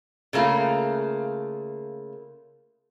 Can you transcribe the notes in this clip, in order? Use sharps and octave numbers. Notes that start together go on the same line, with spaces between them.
C#3 A3 A#3 F4